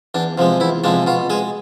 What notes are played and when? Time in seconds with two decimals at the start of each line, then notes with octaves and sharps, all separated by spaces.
0.14 E2 D4
0.38 C3 F3 G#3
0.60 E2 E4
0.84 C3 F3 G#3 D4
1.07 B2 F4
1.30 G#3 G#4